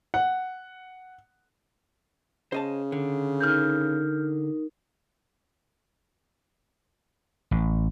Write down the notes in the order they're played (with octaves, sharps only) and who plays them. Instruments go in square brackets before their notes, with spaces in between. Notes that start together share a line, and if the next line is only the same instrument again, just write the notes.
[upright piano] F#5
[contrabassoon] C#3 [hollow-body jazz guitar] C5 D#5 A5
[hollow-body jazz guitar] D3
[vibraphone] D#4 A#4 [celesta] F6 G6
[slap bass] A1